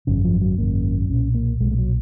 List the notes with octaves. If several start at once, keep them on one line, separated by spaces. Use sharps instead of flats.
G#1 F#2 C#3
F3
F#3
G#1 F#2 C#3 A#3
B1 A#2 C#4
A#3
B1 A#2 G#3
G#3
F#3